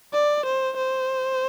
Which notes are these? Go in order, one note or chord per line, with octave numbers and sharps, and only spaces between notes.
D5
C5
C5